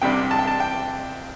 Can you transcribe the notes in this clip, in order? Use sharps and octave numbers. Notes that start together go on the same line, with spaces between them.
C2 C3 G3 D4 G5
A5
G5
A5
G5